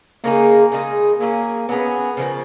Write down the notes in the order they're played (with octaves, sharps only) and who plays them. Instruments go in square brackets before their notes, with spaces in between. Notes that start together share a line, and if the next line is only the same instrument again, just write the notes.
[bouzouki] C#3 G#3 D#4 G#4 [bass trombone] A#3
[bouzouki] C#3 G#3 D#4 G#4
[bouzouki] F#3 C#4 G#4 [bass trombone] A#3
[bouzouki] F#3 C#4 G#4 [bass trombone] B3
[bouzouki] C#3 F3 A#3